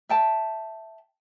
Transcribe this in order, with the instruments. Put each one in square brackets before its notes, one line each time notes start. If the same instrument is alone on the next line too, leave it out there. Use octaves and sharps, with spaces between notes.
[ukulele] E5 G5 A5